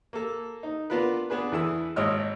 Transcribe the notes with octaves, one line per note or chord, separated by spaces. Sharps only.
A#3 A4
D#4
B3 D4 F4 A#4 B4
B3 D4 G#4 B4
E2 E3 E4 G#4 A4 E6
G#1 C#5 D#5 E6 F6